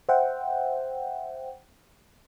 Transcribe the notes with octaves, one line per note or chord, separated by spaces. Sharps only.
C5 E5 F#5 G5